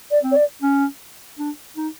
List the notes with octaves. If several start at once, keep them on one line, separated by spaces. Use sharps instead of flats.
D5
C4
C#5
D5
C#4
D4
D#4